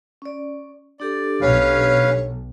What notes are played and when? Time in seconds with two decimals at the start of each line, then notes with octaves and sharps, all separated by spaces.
0.22 C#4 D5
1.00 D4 G4 A4 D5
1.41 B1 C#4 B4 C#5 F5